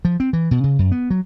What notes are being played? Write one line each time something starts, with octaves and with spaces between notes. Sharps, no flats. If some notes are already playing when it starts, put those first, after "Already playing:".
F3
C4
E3
B2
C#3
F#2
B3
F#3